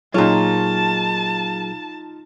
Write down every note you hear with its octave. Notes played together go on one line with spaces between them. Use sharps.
A#2 F#3 D#4 F4 G#4 C#5 A5